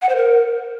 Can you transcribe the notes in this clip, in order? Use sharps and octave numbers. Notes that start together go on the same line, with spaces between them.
F#5
C5
A#4